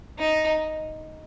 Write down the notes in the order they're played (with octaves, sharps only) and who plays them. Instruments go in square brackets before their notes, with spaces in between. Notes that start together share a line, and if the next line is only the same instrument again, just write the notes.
[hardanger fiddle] D#4